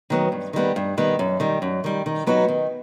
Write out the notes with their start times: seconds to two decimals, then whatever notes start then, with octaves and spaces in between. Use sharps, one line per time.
0.10 D#3 F#3 B3
0.32 G2
0.53 D#3 G3 B3
0.76 G2
0.97 D#3 G3 B3
1.19 F#2
1.40 D#3 G3
1.62 F#2
1.84 D#3 G3
2.06 D#3
2.27 F#3 B3 D#4 F#4
2.48 D#3